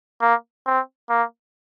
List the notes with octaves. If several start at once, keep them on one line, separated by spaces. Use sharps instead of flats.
A#3
C4
A#3